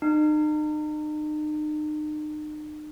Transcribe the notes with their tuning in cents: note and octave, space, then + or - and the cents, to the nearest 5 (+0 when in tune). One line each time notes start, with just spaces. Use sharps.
D#4 -40